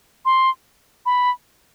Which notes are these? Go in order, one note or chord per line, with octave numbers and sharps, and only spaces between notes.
C6
B5